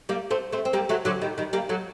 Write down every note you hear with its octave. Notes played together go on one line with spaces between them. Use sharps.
G3 A#3
A3 C4
A3 C4
C4
G3 A#3
F#3 A3
D3 F#3
D#3 G3
D#3 G3
G3 A#3
F#3 A3